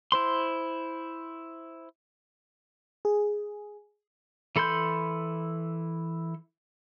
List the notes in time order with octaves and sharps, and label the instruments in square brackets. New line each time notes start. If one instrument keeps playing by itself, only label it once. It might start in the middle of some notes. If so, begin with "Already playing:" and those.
[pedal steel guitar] E4 C5 C6
[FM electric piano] G#4
[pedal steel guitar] E3 A4 B5 C6 G6